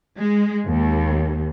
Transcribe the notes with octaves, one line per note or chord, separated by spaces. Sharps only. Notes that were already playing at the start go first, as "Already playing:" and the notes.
G#3
D#2